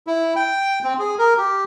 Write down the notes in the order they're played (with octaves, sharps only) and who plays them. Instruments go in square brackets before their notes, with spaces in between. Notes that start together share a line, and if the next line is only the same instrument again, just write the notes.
[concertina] E4
G5
C4
G#4
A#4
G4